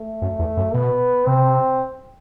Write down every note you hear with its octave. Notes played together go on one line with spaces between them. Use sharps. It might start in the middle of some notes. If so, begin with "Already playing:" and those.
Already playing: A3
F#2
E2
F#2
B2 B3
C3 C4